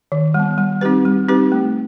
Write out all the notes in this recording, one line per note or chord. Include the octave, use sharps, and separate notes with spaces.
D#3
G3 B3
G3
C4 D#4 G4 B4
G3
C4 D#4 G4 B4
A3